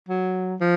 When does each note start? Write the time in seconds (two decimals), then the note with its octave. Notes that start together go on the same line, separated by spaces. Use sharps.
0.09 F#3
0.61 F3